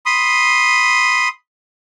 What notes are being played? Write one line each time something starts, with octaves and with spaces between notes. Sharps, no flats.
B5 C6 D#6